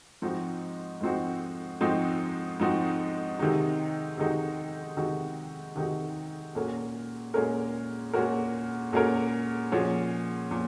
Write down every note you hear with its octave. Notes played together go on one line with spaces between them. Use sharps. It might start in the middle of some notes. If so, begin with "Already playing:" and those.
G#2 F3 C4 D#4 F#4
G#2 F3 C4 D#4 F#4
G#2 F3 C4 D#4 F#4
G#2 F3 C4 D#4 F#4
C3 D#3 G#3 D#4 F#4
C3 D#3 G#3 D#4 F#4
C3 D#3 G#3 D#4 F#4
C3 D#3 G#3 D#4 F#4
A#2 G#3 C#4 F#4 A#4
A#2 G#3 C#4 F#4 A#4
A#2 G#3 C#4 F#4 A#4
A#2 G#3 C#4 F#4 A#4
A#2 F3 G#3 C#4 F#4
A#2 F3